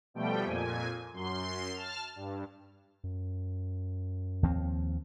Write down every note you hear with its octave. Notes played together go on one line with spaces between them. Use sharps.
B2 F3 G3 A3 G5
F2 A#2 G#5
F#2 C6
A5 F6
G2
F#2
D#2 F3 C4